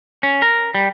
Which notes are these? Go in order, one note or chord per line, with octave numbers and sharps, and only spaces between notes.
C#4
A#4
G3